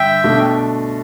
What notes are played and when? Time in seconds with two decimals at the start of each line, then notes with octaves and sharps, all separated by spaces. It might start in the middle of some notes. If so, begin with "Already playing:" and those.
Already playing: G2 D3 E5 G5
0.24 B2 A3 D4